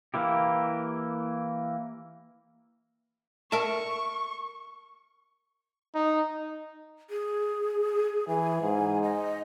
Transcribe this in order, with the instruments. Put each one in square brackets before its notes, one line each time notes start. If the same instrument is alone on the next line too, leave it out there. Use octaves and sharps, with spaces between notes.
[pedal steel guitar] E3 A#3 E4 G4
[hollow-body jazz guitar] A#4 E5 A5 [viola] C#6
[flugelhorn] D#4
[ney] G#4
[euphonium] E3 [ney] G#5
[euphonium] G#2
[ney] D#5